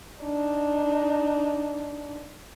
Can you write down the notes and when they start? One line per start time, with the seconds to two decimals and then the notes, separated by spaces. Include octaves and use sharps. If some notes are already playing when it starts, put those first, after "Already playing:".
0.22 D4 D#4